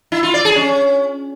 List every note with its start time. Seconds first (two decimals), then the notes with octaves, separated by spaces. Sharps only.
0.12 E4
0.23 F4
0.34 D5
0.45 G#4
0.56 C#4